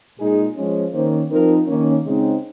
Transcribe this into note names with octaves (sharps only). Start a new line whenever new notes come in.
A#2 G#3 D#4 G#4
F3 G#3 C#4
D#3 A#3 C#4 C5
F3 C4 D#4 A#4
D#3 A#3 C#4
C#3 G#3 C4 D#4